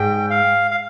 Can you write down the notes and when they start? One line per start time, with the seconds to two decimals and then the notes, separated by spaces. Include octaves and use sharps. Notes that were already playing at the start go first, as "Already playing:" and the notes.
Already playing: G#2 G5
0.30 F5
0.71 F5